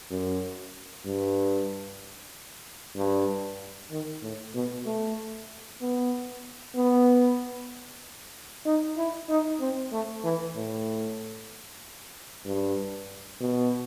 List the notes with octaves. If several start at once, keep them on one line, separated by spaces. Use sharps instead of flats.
F#2
G2
G2
D#3
A2
B2
A3
B3
B3
D#4
E4
D#4
C4
A3
E3
A2
G2
B2